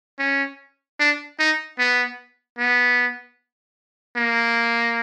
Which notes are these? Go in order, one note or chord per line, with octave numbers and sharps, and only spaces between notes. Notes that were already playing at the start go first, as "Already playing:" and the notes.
C#4
D4
D#4
B3
B3
A#3